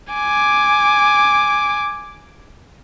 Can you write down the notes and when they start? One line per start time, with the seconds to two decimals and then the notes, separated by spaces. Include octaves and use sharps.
0.13 G#5 D6